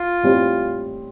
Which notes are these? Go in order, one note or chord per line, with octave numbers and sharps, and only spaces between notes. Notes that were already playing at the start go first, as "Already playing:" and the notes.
Already playing: F4
A2 G3 C4 G4 C5